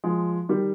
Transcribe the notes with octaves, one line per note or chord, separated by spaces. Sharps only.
F3 G#3
D#3 G3